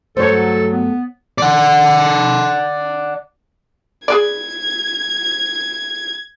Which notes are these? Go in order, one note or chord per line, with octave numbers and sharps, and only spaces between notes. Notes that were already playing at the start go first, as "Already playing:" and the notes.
G2 F#3 A3 A4 C5 C#5
B3
D5 F#5
G#4 B4 D5 G#6